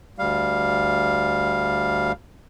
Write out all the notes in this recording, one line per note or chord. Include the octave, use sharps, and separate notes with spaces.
D2 G3 F5